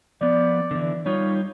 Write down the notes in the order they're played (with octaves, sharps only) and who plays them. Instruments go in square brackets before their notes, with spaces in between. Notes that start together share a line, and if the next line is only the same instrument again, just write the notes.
[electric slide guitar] F3 B3 [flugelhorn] D5
[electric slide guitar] D3 E3
[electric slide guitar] G3 D#4 F4 [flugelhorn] C#5